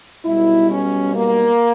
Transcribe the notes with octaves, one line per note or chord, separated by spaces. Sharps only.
B1 B2 G3 E4
C#4
A#3